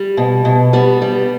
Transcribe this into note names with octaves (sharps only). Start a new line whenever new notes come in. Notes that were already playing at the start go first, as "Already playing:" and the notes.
Already playing: G3
B2
B2
G3 B3
G3